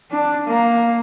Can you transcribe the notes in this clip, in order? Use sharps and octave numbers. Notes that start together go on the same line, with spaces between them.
D4
A#3